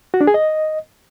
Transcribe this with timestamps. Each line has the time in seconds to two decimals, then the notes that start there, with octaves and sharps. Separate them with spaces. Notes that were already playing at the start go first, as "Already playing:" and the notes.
0.14 F#4
0.21 D4
0.27 G#4
0.34 D#5